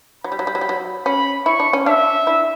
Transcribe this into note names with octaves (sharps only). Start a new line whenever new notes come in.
F#3 B5
G3
F#3
G3
F#3
G3
F#3
C#4 B5
E4 C#6
D4
C#4
D4 E5
E4